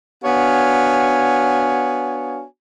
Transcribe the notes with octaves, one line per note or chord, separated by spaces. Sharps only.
B3 D4 F#4 C#5 F5 G#5